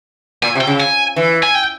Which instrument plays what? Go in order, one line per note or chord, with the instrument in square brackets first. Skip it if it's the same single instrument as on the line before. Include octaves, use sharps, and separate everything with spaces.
[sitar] A#2 [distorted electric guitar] G#5
[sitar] C3
[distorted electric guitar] G5
[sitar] C#3
[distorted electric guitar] G#5
[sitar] E3
[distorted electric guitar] G#5
G5